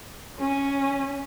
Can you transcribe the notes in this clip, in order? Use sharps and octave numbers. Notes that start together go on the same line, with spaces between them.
C#4